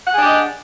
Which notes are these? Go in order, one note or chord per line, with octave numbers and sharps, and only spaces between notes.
D4 G4 G#4 D#5 F#5